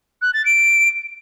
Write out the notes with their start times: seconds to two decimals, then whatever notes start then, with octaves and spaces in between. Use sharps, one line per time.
0.22 F#6
0.34 A6
0.45 D7